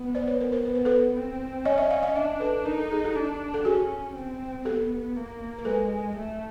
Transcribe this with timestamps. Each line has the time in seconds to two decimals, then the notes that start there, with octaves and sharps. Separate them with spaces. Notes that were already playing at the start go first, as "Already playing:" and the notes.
Already playing: B3
0.15 C5 D5
0.27 B4 C#5
0.41 A#4 C5
0.52 A#4 C5
0.65 B3 B4
0.75 C5
0.85 A4 B4
1.16 C4
1.65 C#4 C#5 D#5
1.78 D5 E5
1.90 D#5 F5
2.02 D#5 F5
2.15 D4 D5 E5
2.40 A4 B4
2.65 D#4 A#4
2.79 A4
2.92 G#4
3.04 G4 A4
3.15 D4
3.54 A4
3.65 C#4 F#4 G#4
4.15 C4
4.65 B3 G4 A4
5.16 A#3
5.59 A#4
5.65 G#3 A4 B4
6.16 A3